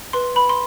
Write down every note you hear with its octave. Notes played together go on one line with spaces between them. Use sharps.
B4 C6
B4 B5
C6